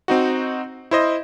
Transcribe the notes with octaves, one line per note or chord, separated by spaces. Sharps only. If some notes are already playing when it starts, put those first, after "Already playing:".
C4 D#4 F#4
E4 C5 D#5